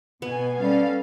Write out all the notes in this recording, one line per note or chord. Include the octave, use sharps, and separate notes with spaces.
B2 B3 G#5
G3 C#4 A4 F5